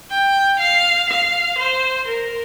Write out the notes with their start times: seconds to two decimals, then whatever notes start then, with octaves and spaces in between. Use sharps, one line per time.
0.10 G5
0.59 F5
1.09 F5
1.58 C5
2.08 A#4